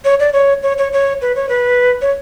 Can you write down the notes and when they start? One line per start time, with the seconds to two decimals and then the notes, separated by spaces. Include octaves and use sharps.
0.05 C#5
0.20 D5
0.33 C#5
0.63 C#5
0.78 C#5
0.93 C#5
1.21 B4
1.35 C#5
1.49 B4
2.02 C#5